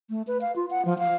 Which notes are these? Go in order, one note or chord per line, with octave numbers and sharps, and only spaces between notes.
A3
B4
F5
F4
F#5
F3
F5